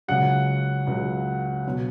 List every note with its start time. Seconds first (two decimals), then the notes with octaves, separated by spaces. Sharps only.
0.08 C#2 C#3 F#3 F#5
0.87 C#2 C#3 F#3
1.65 B2 F#3